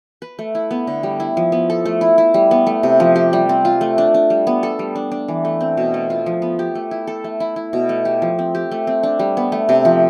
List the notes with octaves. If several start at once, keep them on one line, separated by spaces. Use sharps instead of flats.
B4
A3
E4
B3
D3
G3
E4
F3
B3
A4
A3
E4
E4
G3
B3
A3
C3
F3
G4
G3
C4
F4
A3
D4
D4
G3
B3
A4
G3
D4
D4
E3
A3
C4
B2
A3
F4
F3
B3
G4
A3
E4
A4
A3
E4
E4
B2
A3
G4
F3
C4
G4
A3
C4
D4
G3
B3
A3
C3
F3